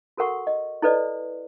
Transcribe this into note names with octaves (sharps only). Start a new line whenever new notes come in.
F#4 A4 A#4 F#5 C#6
D#5
E4 A4 B4 D5 D#5